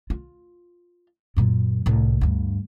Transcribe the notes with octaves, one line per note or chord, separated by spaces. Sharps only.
F4
F#2 A#2
C2 A2
D2 G2